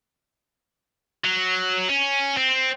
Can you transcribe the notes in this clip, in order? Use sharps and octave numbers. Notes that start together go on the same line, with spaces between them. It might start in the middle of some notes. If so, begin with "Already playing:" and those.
F#3
C#4
C4